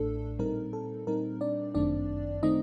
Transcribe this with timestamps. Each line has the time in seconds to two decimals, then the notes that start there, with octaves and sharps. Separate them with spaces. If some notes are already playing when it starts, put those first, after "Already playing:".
Already playing: A1 A2 A3 D4 A4
0.39 A#2 G3 C4 D#4 A#4
0.73 A4
1.07 A#2 G3 C4 D#4 A#4
1.41 D4 D5
1.75 G1 F#2 D#3 A3 C4 D4 D5
2.43 D#3 A3 C4 D#4 D#5